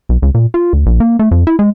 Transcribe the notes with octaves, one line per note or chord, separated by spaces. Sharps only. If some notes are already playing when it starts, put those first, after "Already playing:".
B1
C#2
A#2
F4
D2
A#1
A#3
A3
F2
E4
G#3